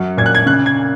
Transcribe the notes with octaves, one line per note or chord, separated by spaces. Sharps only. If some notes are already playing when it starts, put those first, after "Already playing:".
Already playing: F#2 F#3
A#2 G#6
F#6
G#6
C#3 F#6
G#6